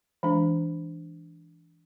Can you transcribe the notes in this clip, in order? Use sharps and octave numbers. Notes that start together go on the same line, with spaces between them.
E3 G#3 D4